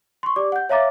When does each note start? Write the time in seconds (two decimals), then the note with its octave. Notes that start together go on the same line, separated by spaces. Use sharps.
0.23 C6 C#6
0.36 G4 D5 D6
0.52 F#5 G6
0.69 C#5 E5 F5 A#5 D6 A6